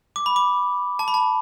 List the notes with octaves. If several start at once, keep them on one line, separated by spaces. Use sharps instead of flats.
D6
B5
D6
A5
B5
A5